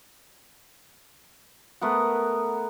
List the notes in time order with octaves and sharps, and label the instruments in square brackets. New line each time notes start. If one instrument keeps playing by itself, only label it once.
[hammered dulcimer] A3 B3 A#4 F#5